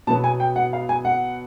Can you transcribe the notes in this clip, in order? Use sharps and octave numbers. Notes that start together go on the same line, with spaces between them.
B2 F#3 B3 A5
G#5
G5
F#5
F5
G#5
F#5